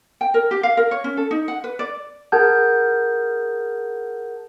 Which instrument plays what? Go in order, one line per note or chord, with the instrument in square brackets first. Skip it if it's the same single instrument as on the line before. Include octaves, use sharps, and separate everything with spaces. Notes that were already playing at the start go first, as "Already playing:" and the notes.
[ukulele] G5
A#4
G4
F5
A#4
C#5
C#4
A4
D#4
F#5
B4
D5
[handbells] G#4 A#4 F#5 A5 G6 G#6